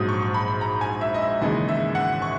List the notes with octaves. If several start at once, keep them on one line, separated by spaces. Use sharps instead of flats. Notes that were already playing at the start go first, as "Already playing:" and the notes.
Already playing: A#1 G#2 F#3 D#6
C#6
B5
A#5
G#5
E5
D#5
E5
D#2 C#3 E3 G#3 D#5
E5
F#5
C#6